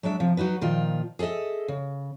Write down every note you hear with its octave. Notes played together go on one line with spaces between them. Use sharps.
F#3 G#3 D4 E5
C3 F3
F#3 D#4 F#4 B4
A#2 D#3 F3 F4
G#4 A4 C#5 D#5 E5
C#3